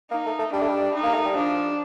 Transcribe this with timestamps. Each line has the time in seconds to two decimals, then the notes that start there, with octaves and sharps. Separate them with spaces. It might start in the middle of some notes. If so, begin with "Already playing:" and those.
0.11 A#3 D#4
0.26 A3
0.39 A3
0.52 G3 D4
0.61 A3
0.68 G3
0.95 D#4
1.03 A#3
1.14 A3
1.25 G3
1.36 F3 D4